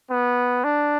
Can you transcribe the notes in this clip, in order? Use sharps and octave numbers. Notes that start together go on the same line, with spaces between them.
B3
D4